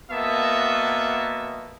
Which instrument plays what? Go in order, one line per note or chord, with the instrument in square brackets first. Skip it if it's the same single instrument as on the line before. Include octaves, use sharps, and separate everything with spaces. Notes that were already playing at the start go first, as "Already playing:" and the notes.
[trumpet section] A#3 B3 F#4 D#5 E5 A5